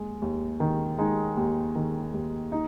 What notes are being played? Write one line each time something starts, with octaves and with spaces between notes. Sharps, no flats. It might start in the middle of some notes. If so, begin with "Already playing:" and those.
Already playing: D#2 G#3
D#2
D#3
G#3 D#4
D#2
D#3
D#2
D#4